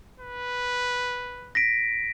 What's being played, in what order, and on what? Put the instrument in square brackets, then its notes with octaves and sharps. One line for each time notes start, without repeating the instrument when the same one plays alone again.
[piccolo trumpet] B4
[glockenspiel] A#6 B6 D7